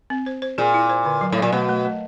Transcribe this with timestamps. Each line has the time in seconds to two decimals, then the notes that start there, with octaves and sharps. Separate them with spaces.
0.10 C4
0.26 C5
0.42 C5
0.58 A#2 G#4
0.74 E4
0.89 C5
1.05 D3
1.21 F#3
1.32 A2
1.38 A#2 F#3
1.52 B2 A3
1.69 A3
1.85 A3